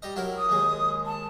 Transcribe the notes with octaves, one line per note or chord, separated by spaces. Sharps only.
G3 D#5
F#3 E4 A#4
D#6
D#2 G#3
A5